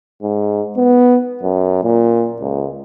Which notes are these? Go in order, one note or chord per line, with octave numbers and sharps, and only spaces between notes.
G#2
B3
F#2
A#2
C#2